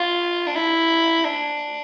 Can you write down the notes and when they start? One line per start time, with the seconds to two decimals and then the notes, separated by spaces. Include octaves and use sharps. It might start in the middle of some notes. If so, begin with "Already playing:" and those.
Already playing: F4
0.47 D4
0.56 E4
1.25 D4